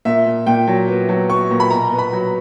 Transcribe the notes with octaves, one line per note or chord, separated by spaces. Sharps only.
A#2 E5
A#2
A#2 G5
F#3
B3
F#3
B3 C#6
A#2
B5
B2 A#5
B3
B5
F#3